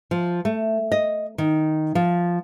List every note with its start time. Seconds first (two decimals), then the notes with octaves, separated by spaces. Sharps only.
0.11 F3
0.45 A3
0.92 D#5
1.38 D#3
1.95 F3